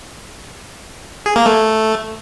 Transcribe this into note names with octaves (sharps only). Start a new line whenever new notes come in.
G#4
A#3
A3